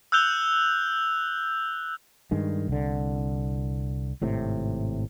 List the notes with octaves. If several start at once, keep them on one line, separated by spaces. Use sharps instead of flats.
E6 F#6 G6 F7 G7
G2 D#3 G#3
C2 D3
G#1 A2 C3